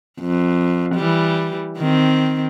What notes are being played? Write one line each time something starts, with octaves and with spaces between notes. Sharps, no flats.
F2
E3 G3
D#3 C4